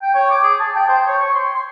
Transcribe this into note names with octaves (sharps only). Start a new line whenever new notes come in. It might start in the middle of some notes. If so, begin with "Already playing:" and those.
G5
C#5
D6
G#4
A5
G5
C5
C#5
C#6
C6
C6